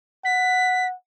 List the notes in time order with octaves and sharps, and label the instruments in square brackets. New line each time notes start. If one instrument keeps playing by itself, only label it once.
[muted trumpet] F#5 [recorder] B6